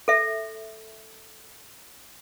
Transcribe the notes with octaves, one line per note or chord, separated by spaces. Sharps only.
A4 E5